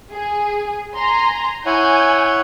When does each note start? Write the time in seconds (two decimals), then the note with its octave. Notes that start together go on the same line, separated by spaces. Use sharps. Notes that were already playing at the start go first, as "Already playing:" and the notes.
0.11 G#4
0.96 G#5 A#5 C6
1.66 E4 C#5 F#5 G#5 G6